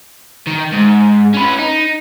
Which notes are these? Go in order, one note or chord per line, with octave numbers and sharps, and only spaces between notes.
D#3
G#2
C#4 B4
D#4